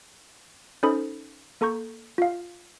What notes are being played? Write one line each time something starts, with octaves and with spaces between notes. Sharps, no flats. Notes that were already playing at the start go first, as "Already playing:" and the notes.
C#4 D#4 A4 C5 B5 D#6
A#3 A4 A#5 C#6 G6
F4 F5